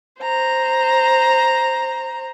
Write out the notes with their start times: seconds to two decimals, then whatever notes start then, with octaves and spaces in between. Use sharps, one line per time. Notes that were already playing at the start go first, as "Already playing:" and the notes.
0.21 C5 A#5